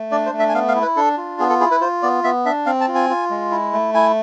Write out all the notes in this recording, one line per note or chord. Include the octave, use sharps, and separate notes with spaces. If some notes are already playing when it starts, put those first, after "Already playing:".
Already playing: A3
D4 D5
C5
A3
E5
G#5
B3 F5
F5
E4
B4
D4 A4
F4
B3 G#4
A4
E4 G#4
B4
F4 C5
B3 D5
B3 E5
D4 E5
C4 F5
A5
F4
G#5
F4
G#3
E4
A3
E4 G#5